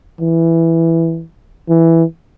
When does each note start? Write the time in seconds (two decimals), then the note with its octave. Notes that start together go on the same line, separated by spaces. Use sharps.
0.20 E3
1.69 E3